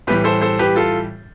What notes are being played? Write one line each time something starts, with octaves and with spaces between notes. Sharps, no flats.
A2 E3 G3 G4 B4
A4 C5
A4 C5
G4 B4
F4 A4